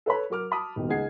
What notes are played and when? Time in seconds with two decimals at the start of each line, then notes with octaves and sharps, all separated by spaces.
0.06 A4 B4 C#5 B5
0.30 F#3 F#4 A#4 D6 F6
0.51 A5 B5 D6 D#6
0.76 D#1 B2 D#3
0.89 C#2 D#4 G#4 F#5 G#6 C7